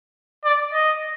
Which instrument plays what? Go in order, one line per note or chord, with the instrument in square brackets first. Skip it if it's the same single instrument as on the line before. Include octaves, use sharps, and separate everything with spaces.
[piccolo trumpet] D5
D#5